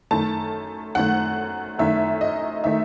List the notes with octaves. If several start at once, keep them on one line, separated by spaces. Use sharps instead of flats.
F#2 D#3 A3 A5
F#2 D#3 A3 F#5
F#2 D#3 A3 E5
D#5
D#3 A3 E5